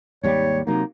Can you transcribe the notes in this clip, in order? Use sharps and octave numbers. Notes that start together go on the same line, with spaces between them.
G#1 D#2 G3 C#5
C3 F#3 A#3 D#4